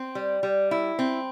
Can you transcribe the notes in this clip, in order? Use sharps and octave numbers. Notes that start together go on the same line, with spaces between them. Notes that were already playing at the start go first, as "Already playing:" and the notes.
Already playing: C4
G3
G3
E4
C4